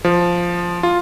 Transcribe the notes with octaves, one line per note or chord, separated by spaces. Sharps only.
F3
F4